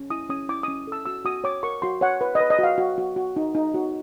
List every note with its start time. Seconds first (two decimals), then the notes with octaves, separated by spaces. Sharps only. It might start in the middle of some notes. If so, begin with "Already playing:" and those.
Already playing: C#4
0.10 E4 D#6
0.29 C#4 D#6
0.49 E4 D6
0.63 C#4 D#6
0.87 A4 E6
1.06 F#4 E6
1.25 F#4 D#6
1.44 C#5 D6
1.63 A#4 C#6
1.82 F#4 C6
2.01 C#5 F#5
2.21 B4
2.35 D#5
2.40 B4
2.50 D#5
2.59 F#4 F5
2.78 F#4
2.98 F#4
3.16 F#4
3.36 D#4
3.55 D#4
3.74 F#4